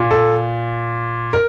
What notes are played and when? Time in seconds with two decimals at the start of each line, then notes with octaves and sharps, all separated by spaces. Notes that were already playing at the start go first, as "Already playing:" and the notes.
Already playing: A#2
0.11 A4
1.33 A#4